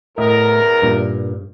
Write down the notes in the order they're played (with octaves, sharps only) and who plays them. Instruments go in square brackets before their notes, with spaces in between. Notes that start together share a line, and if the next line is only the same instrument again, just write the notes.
[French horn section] E2 A#4 [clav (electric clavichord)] A2 D#5 E5
[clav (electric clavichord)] G2 A#2